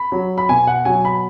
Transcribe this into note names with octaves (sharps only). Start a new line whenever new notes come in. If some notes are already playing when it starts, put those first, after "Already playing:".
Already playing: B5
F#3
B5
B2 G#5
F#5
F#3 G#5
B5